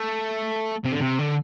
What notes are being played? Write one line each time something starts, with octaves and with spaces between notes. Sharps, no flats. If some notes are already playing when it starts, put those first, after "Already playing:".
Already playing: A3
C3
D3
C3
D3